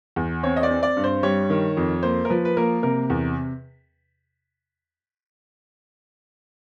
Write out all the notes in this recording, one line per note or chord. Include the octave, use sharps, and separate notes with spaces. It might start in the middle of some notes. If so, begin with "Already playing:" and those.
E2
C4 C#5
D#5
D5
C4
D5
G2
C5
G3 C#5
D#3
F2
A#3 C5
A#4
F3 B4
B4
A#3 A#4
C3 A#4
E2